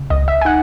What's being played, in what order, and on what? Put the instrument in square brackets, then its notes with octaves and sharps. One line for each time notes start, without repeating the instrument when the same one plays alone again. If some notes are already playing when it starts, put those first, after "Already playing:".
Already playing: [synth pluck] C#3
C#2 D#5
E5
G#5
D#4 F#5